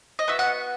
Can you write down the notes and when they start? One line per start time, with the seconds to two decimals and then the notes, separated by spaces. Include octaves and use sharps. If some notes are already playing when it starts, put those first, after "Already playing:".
0.19 D#5
0.28 B3 F#4 E5
0.39 F#5